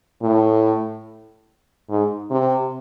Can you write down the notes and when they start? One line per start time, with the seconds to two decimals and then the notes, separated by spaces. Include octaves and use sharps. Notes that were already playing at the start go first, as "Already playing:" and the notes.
0.23 A2
1.90 G#2
2.31 C3